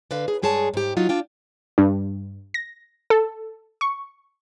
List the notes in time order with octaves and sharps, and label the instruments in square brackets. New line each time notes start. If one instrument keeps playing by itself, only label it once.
[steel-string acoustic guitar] D3 B4 F5
D#2 G#4
G2 G#3 G#4 C#5 A5
G#2 G4
F#3 D#4 F4
D4 F4 G5
[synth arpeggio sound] G2
A#6
A4
C#6